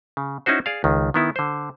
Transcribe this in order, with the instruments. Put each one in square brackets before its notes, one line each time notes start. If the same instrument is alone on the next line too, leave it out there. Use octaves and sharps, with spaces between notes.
[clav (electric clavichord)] C#3
C#4 D#4 E4 F#4 C5
G#4 D5 F5
C#2 D#3
D#3 B3 E4
D3 C5